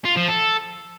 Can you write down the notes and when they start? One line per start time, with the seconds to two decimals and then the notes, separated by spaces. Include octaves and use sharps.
0.05 F4
0.17 F3
0.28 A4